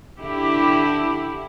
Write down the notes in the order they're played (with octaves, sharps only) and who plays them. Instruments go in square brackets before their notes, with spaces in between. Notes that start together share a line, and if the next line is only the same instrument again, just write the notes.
[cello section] D3 E4 G4